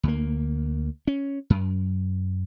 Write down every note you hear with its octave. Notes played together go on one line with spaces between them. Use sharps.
D2 A#3
C#4
F#2